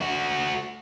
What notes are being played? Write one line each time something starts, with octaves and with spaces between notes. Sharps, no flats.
A3 F#4